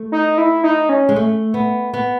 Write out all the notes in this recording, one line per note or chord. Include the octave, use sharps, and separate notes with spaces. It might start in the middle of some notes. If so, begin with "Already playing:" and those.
Already playing: A3
D#4
E4
D#4
C#4
G#3
A3
B3
B3